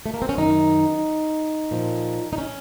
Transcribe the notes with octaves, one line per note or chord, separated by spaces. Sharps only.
A3
A#3
C4
C#4
F#2 D#3 D#4
A#2 F3
D#4
C#4